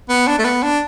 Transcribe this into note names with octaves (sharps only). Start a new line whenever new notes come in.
B3
D4
A3
B3
D4